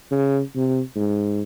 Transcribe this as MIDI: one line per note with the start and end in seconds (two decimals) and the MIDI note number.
0.11 0.41 49
0.56 0.81 48
0.96 1.43 44